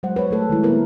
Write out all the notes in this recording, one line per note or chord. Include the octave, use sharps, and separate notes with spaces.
F#3 G#3 C5 F#5
B4 C#5
A3 A4
D#3 G#3 E4
A#3 B3 E4 A#4 B4